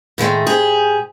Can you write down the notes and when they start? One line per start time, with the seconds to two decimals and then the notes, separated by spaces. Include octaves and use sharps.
0.18 A2 D#3 G#3 A3
0.47 G#2 G4 G#4